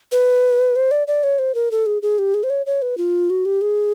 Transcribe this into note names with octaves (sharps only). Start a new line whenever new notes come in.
B4
C5
D5
D5
C#5
C5
A#4
A4
G#4
G#4
G4
G#4
C5
C#5
C#5
B4
F4
F#4
G4
G#4